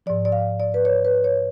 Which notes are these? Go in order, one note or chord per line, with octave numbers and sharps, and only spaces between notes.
G#2 F3 D5
D5
F5
D5
B4
C#5
B4
C#5